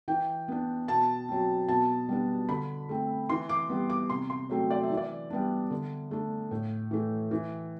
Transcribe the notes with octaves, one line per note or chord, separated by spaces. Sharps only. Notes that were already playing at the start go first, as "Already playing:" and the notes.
E3 G5
B3 D4
B2 A5
F#3 C4
B2 A5
G3 B3 D4
D3 B5
A3 C4
E3 C6
D6
G3 B3
D6
C3 C6
C6
F#3 A3 C4
D5
E5
E3
D5
G3 B3 D4
D3
A3 D4
A2
E3 A3
E3